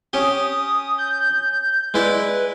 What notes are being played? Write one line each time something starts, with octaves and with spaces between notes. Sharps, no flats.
C#4 G4 D#6
G6
G#3 E4 B4 D5